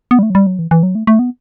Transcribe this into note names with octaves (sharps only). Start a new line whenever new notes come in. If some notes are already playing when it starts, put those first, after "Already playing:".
B3
G3
A3
F#3
G3
F#3
E3
E3
F#3
A3
A3
B3